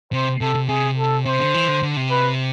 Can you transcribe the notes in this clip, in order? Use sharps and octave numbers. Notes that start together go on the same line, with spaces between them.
C3 C5
C3 A4
C3
C3 G#4
A4
C3 C5
D3
E3
D3
D3
C3
B4